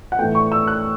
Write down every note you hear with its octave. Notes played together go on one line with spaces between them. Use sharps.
F#5
A2 E3 A3 G5
C#6
E6
F#6